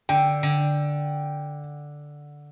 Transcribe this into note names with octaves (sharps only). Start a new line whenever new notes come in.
D3 G5
D3